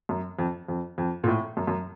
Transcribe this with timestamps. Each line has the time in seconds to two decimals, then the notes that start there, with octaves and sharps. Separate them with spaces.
0.09 F#2
0.39 F2
0.68 F2
0.98 F2
1.24 A#2
1.28 A2
1.57 F#2
1.67 F#2